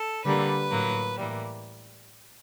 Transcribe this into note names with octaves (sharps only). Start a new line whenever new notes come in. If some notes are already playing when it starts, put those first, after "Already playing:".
Already playing: A4
D3 G3 A#3 B4
A2 F#3 A#3
A2 E3 G3 A#3